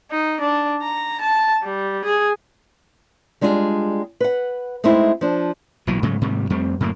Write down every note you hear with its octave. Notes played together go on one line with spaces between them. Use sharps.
D#4
D4
A#5
A5
G3
G#4
G3 G#3 D4 F4 G#4
B4 F#5
G#3 A3 C4 D#4 E4
F3 D4
B1 A#2 E3 F#3
G#2 C#3 F#3 A3
G#2 C3 D#3 G3
F2 G3 A3 C4
F#2 A2 D3 A#3